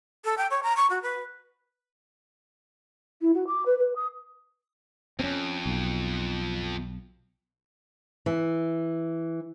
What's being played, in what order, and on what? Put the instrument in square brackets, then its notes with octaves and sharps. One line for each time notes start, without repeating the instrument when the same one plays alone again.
[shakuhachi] A4
G5
C#5
A#5
C#6
F#4
B4
E4
F#4
D6
B4
B4
D#6
[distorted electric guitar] F2 [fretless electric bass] C4 C#4
[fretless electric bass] B1
[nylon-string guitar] E3